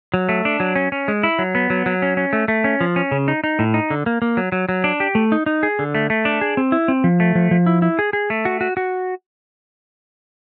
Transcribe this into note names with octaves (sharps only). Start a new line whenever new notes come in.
F#3
A3
D4
F#3
C#4
C#4
G#3
E4
F#3
B3
F#3
F#3
C#4
C#4
A3
A3
C#4
F3
C#4
C#3
D#4
D#4
A2
D#4
D3
A#3
A#3
F#3
F#3
F#3
D4
G4
A3
D#4
D#4
G#4
D3
A3
A3
D4
G#4
C4
E4
C4
F3
A3
F3
F3
E4
E4
G#4
G#4
A3
F#4
F#4
F#4